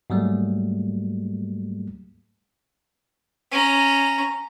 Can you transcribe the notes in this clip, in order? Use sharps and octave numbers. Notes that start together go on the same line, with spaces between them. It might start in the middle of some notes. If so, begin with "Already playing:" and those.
G#2 F#3 G3 A3 A#3
C#4 A#5